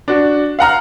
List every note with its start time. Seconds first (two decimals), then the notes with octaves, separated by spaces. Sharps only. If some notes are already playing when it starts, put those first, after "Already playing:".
0.08 D4 F#4
0.59 F5 F#5 A#5 F6